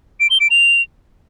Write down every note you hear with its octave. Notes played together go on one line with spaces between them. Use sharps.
D7
G7
D7
F7